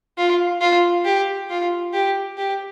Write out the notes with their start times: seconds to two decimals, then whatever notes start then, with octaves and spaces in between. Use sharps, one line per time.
0.18 F4
0.61 F4
1.05 G4
1.50 F4
1.93 G4
2.38 G4